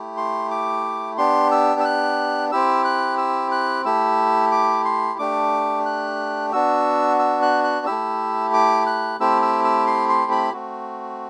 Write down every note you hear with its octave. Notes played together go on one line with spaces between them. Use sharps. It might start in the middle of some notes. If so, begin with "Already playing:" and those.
Already playing: A3 E4 G4
C6
D6
B3 D4 G4 C6
E6
E6
F#6
C4 E4 G4 E6
F#6
E6
F#6
A3 E4 G4 E6
D6
C6
A3 D4 G4 D6
F#6
B3 D4 F#4 E6
E6
F#6
F#6
A3 E4 G4 E6
D6
F#6
A3 C4 E4 G4 E6
E6
E6
C6
C6
B5
A3 C4 F#4